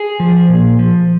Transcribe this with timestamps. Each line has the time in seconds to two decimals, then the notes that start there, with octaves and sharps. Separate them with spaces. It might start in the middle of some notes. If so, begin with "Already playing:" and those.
Already playing: G#4
0.20 F3
0.49 A#2
0.79 F3